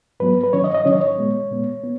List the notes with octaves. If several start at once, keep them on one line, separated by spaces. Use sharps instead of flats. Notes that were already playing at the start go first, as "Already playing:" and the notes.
G#2 F#3 B3 B4
B4
G#2 D#3 F#3 C#4 C#5
D#5
D#5
G#2 D#3 F#3 C#4 C#5
D#5
C#5
A#2 G#3 B3
A#2 G#3 B3
B3